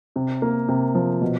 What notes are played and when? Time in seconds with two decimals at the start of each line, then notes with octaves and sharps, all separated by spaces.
0.16 C3
0.42 A#3
0.68 C3
0.95 F3
1.22 B2